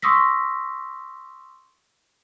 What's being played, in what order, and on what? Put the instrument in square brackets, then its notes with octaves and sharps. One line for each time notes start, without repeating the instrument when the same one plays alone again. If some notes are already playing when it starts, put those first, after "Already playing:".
[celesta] C6 C#6 D#6 E6 A#6 B6